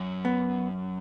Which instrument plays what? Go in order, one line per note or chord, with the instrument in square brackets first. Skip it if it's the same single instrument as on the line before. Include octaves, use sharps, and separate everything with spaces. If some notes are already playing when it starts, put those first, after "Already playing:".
Already playing: [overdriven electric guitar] F#2
[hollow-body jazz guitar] B3